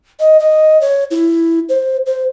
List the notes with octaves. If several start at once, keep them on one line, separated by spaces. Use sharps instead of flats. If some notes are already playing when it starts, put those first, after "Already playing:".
D#5
D#5
C#5
E4
C5
C5